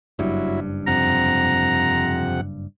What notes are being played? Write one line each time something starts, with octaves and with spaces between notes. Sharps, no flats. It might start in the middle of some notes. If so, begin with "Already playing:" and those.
F#1 G2 F#3 E4
F2 C3 F#5 A#5